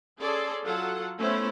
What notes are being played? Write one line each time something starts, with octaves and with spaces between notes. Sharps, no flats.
C#4 G#4 A4 D5 C6
F#3 F4 A4 F#5
A3 B3 C#4 E4 C5